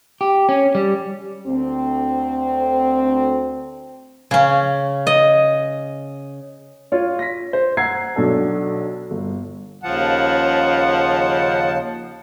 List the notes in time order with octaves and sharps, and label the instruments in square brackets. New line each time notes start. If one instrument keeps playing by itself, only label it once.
[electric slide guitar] G4
C#4
G3
[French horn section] D2 C4
[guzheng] C#3 C#4
D#5
[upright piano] F4 C#5
A#6 B6
C5
F#5 A#5 E6 G#6 C7
B1 F#3 D4 A4
G1
[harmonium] D#2 C#3 A5 [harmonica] F3 F#5